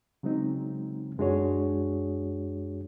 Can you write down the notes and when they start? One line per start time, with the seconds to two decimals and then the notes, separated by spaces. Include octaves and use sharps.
0.23 C#3 F#3 G#3 C4 D#4
1.18 F#2 G#3 D4 F#4 G#4 C#5